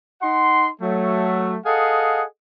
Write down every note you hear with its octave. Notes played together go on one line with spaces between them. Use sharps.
D#4 F#5 C6
F#3 A3
G#4 A4 D#5 F5 F#5